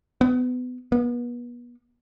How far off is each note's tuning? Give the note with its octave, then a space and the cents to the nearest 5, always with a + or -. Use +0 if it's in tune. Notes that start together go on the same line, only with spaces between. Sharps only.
B3 +25
B3 -35